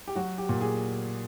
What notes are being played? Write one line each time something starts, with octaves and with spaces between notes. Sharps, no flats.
G4
F#3 F#4
G4
A#2
G#4